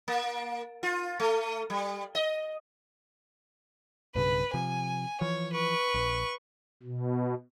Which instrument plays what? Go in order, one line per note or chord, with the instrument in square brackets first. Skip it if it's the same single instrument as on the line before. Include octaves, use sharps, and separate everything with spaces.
[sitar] A#3
F4
A3
G3
D#5
[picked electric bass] B1 G2 C#3 [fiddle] B4
[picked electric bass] C3 F3 [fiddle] G#5
[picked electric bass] E3 F3 [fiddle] C#5
[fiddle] B4 C#6
[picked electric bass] A#1
[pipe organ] B2